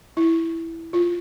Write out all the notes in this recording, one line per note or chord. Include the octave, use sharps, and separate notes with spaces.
E4
F4